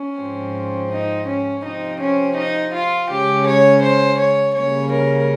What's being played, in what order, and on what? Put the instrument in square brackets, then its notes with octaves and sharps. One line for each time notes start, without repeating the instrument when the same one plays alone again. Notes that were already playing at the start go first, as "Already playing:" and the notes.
Already playing: [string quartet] C#4
G#2 F3 C4
D#4
C#4
C3 F3 C4 D#4
C#4
D#4
F4
C#3 G#3 C#4 G4
C#5
C5
C#5
C#3 G3 A#3 C#4 C#5
A#4